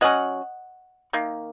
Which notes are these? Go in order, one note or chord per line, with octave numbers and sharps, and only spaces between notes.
F#3 C#4 D#5 F#5
D#3 A#3